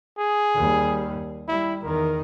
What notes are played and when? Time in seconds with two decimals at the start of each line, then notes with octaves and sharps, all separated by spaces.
0.18 G#4
0.55 D#2 G3
1.48 G3 E4
1.83 E2 D#3 A#4